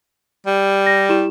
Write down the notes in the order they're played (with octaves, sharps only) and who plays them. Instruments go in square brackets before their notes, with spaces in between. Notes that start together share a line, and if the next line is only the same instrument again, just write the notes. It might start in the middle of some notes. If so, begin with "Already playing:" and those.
[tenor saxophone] G3
[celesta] A#6
E4 G4 E7